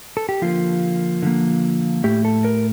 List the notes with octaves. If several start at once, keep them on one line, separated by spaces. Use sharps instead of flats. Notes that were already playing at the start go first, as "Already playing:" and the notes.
A4
G4
D3 F3 A#3 F4
D3 F3 A#3
A2 A3 G4
A4
A#4